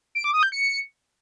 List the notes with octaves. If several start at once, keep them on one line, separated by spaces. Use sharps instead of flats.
D7
D6
D#6
G6
C#7